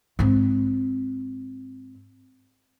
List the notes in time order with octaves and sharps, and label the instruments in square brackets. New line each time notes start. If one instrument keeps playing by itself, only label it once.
[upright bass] G#2 C4